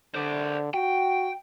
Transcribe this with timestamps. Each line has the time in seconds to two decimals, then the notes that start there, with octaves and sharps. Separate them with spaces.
0.15 D3 C5 D5
0.74 F#4 G5